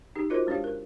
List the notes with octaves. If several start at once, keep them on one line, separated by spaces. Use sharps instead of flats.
D#4 G4 G#4
F4 F#4 A#4 C5 D#5
G#3 D4 G4 C#5 F5
A#4